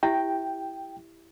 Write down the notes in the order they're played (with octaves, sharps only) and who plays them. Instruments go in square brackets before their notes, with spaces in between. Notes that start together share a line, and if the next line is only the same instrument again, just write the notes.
[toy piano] E4 G4 E5 [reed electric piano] G5